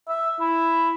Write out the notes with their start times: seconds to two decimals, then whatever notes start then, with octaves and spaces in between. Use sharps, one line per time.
0.08 E5
0.40 E4